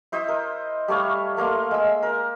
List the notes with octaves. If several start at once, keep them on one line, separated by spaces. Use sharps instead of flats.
E4 C5 D#5 E5
A#4
G3 A3 C#5 F5
A3 A#3 F5 C6
G#3 E6
A#4